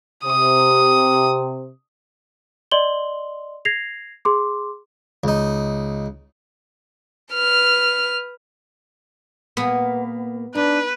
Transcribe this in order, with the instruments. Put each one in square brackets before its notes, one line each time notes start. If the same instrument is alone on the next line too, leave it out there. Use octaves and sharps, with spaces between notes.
[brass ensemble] C3 [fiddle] D#6
[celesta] D5 D#5 C6 F#7 G7
G#6 A#6 C7 F7
G#4 C6 D6
[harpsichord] C#2 D#4
[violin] B4 F6
[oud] A#2 A#3 G#4 [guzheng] B3
[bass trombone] D4 [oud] D#4 [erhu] B4